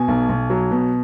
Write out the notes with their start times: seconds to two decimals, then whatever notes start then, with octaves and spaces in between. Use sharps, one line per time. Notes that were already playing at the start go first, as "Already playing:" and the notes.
Already playing: B2 G#5
0.08 B1
0.29 B1
0.50 F#3
0.71 B2